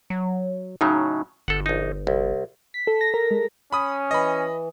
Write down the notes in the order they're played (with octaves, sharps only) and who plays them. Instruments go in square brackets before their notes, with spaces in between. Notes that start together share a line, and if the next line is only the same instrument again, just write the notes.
[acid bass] F#3
[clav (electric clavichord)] A2 C#3 F#3 [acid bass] D#4
[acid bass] G1 [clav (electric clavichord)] A4 F#5
[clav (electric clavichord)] A#1 D#4
C2
[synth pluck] B6
A4
A#6
A#4
G#3
[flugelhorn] C#4 [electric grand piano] B5 D#6
[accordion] E3 [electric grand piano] D#5 B5